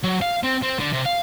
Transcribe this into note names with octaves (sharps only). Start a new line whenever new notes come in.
F#3
F5
C4
C4
D3
C3
F5